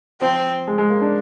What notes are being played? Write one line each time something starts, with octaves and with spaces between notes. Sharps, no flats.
F3 C4
G#3
G#3
A#3
D4